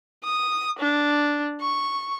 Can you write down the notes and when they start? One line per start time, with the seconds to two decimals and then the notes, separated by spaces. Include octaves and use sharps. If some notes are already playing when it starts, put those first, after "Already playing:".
0.24 D#6
0.79 D4
1.61 C#6